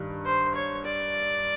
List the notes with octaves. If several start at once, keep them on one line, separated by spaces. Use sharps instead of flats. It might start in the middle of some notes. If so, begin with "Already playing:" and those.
Already playing: G2 D#3
C5
C#5
D5